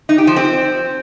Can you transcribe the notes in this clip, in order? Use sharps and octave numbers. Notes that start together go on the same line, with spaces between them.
D#4
G4
F3
C4